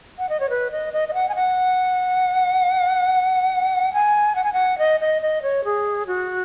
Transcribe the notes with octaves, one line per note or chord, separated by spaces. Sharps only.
F#5
D#5
C#5
B4
D#5
D#5
D#5
F#5
G#5
F#5
G#5
F#5
G#5
F#5
D#5
D#5
D#5
C#5
G#4
F#4